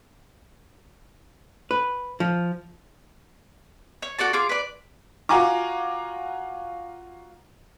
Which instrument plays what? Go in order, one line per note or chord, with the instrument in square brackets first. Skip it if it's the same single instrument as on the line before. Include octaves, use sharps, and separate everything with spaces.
[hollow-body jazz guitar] B4
F3
[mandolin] C#5
F#4 A4 D5 A5
F4 G#4 D6
B4 D5
[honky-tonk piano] F4 F#4 F#5 G#5 A#5 D6